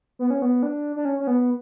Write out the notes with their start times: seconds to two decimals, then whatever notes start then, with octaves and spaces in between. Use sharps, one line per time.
0.19 B3
0.30 C#4
0.42 B3
0.63 D4
0.96 D4
1.05 C#4
1.20 C#4
1.27 B3